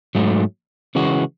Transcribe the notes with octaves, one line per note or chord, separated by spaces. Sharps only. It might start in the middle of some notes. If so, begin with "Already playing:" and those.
G#2 F#3 A3
C#3 E3 G#3 C#4 F#4